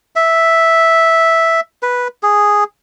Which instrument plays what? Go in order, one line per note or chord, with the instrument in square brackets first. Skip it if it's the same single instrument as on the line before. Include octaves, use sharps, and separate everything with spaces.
[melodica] E5
B4
G#4